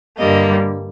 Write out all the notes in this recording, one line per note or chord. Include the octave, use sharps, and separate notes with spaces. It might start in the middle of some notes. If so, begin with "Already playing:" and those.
G2 D3 G3 A#3 D#5